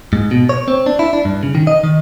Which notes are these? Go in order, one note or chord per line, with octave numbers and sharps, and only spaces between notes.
G#2
B2
C#5
C4
D4
E4
D4
G2
C#3
D#3
D#5
D#3